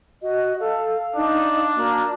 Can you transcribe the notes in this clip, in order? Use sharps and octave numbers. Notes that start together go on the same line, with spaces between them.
F#4 D#5
A4 F5
D4 D#4
A#3 F#4